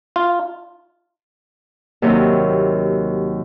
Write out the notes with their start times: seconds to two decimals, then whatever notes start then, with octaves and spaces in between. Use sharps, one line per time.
0.16 F4
2.02 D#2 C3 F#3